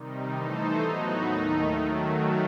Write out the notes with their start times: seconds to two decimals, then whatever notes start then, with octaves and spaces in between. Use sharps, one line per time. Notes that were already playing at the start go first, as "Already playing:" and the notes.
Already playing: C3 D#3 G3 D#4
0.36 E3 A3 D#4 A4 C5
0.80 A2 F#3 B3 D#4 F#4
1.24 D#2 D#3 A3 D#4
1.68 D#3 F#3 A3